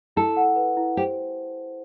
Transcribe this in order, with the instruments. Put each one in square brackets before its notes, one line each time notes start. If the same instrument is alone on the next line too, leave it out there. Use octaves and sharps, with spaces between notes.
[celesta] E4 [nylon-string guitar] A4
[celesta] F#5
B4
E4
[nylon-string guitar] G4 [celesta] C5